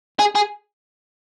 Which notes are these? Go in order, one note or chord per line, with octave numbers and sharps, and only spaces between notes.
G#4
G#4